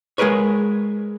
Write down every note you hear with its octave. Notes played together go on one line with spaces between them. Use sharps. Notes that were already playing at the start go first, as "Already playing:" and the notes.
G#3 G#4 A#4 B4 C#5